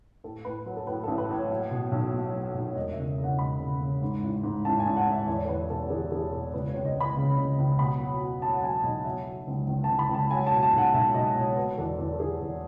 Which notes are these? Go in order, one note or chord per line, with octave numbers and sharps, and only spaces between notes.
A2 A4
A2 B4
F#3 B4
A4
A2 B4
A1 A4
B4
A2 C#5
F#3
B2
B1
B2
F#3
B1
C#5
E1 D#5
C#3 E5
C#3
F#5
E1 B5
C#3
C#3
G#2
A1
G#2
A1 A5
G#5
A1
F#5
A1
E5
E2 C#5
A4
E2 B4
B2 A4
E2 G#4
E2 G#4
B2 A4
C#2 B4
C#5
C#2
D#5
C#2 B5
C#3
C#3
C#2
B2 B5
F#3
F#3
F#3 A5
F#5
F#3 G#5
B1 D#5
F#3 E5
F#3
C#2
C#2
A5
C#2
B5
C#2
A5
F#3 G#5
A5
B2
A5
B1 F#5
B1 E5
B1 D#5
B2 C#5
F#3 B4
E2 A4
E2 B4
A4
E2 G#4
E2